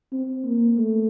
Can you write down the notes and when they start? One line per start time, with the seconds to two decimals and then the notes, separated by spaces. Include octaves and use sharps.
0.12 C4
0.45 A#3
0.78 A3